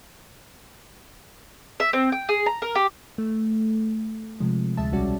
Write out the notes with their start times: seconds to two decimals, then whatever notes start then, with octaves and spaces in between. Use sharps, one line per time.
1.80 E5
1.93 C4
2.12 G5
2.29 G#4
2.46 A#5
2.62 A#4
2.75 G4
3.18 A3
4.40 C3 F3 G#3
4.77 D2 G#3 E5 A5
4.92 B1 G3 C#4 F#4 D5